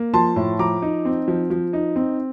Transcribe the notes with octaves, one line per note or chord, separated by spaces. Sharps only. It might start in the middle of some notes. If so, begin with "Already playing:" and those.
Already playing: A#3
F3 A5 C6
A2
F3 A#5 D6
D#4
C4
F3
F3
D#4
C4